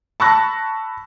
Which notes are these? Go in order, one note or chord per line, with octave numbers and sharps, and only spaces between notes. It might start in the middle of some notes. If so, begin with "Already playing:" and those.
A5 B5 C#6 E6 F#6 A#6